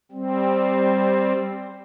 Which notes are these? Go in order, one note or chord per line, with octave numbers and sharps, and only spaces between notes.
G3 C4